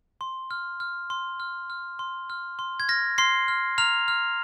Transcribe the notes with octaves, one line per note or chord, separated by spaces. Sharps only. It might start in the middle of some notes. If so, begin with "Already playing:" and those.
C6
F6
F6
C6
F6
F6
C6
F6
C6
G#6
F6 A#6
C6 F6 C7
F6
A#5 F6 F7
F6